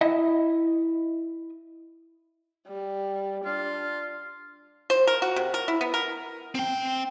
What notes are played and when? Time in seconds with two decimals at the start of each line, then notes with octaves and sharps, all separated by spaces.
0.01 E4 D#5 E5
2.68 G3
3.45 D4 F4
4.90 C5
5.07 A#4
5.22 F#4
5.36 C3
5.54 A#4
5.68 E4
5.81 B3
5.94 A#4
6.55 C4 G5